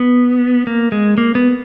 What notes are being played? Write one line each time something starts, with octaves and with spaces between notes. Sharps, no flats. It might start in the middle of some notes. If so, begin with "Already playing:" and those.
Already playing: B3
A#3
G#3
A#3
B3